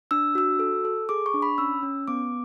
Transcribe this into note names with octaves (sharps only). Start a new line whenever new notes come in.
D4 E6
F#4 E6
A4
A4
G#4 D6
C#6
D4
B5
C#4 E6
C#4
B3 D6